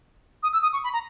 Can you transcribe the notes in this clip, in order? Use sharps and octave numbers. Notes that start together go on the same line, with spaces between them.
D#6
E6
D#6
C#6
B5
A#5